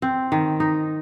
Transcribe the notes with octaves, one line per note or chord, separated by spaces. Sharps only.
C4
D#3
D#4